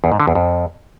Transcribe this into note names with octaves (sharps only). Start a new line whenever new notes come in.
E2
G#2
D3
E2
F2